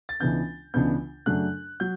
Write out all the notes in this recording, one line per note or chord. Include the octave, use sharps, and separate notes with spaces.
A6
C#2 C#3 E3 B3 D4 G6
C#2 C#3 E3 B3 D4 G6
F#2 C#3 F#3 A3 D4 F#6
F#3 G6